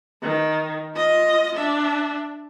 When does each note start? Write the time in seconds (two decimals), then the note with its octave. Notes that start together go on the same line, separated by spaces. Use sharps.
0.22 D#3
0.95 F4 D#5
1.56 D4 E5